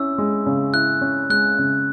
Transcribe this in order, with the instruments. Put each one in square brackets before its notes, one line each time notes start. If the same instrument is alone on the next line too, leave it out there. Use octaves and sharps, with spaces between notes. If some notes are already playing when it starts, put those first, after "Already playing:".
Already playing: [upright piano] C#4 E4 [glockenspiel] E6
[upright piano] G#3
C#3
[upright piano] E4 [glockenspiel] F#6
[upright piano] C#4
[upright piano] G#3 [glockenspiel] F#6
[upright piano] C#3